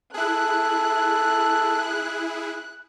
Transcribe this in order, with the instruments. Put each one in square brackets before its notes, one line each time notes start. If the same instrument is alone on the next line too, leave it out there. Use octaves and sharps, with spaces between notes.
[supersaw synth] E4 G#4 [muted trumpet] A4 [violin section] F#6